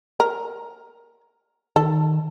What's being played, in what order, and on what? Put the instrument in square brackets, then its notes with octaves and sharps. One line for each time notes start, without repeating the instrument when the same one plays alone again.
[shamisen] A#4
[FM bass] D#3 [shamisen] A4